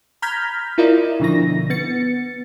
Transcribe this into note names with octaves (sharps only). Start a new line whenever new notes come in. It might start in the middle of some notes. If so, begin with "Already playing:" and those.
A#5 B5 F6 G6 G#6 B6
E4 F4 A#4 D5 D#5
B2 D3 F3 E4 A#6
B3 A6 C#7